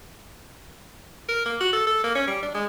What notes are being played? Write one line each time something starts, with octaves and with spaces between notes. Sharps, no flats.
A#4
A#3
F#4
A4
A4
A#3
C#4
G3
D4
G#3